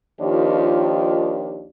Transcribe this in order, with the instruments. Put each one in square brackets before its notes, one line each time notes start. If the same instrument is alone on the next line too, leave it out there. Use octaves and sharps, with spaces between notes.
[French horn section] D#2 D#3 F3 D4 F4 G4